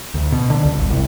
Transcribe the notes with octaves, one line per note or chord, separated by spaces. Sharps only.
D2
B2
D3
C#2
G1
C2